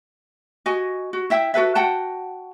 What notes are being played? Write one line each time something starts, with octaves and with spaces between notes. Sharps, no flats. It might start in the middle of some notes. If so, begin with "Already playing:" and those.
F#4 D#5 G#5
F#4
E4 E5 G5
F#4 A4 B4 E5
F#4 F#5 G5 A5